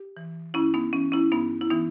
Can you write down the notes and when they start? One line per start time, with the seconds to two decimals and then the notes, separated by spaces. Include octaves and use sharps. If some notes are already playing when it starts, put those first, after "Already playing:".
Already playing: G4
0.17 E3
0.54 G2 C#4 E4
0.74 B3 D#4
0.93 E3 C#4
1.12 C#4 E4
1.32 G2 B3 D#4
1.61 E4
1.70 E3 B3 D#4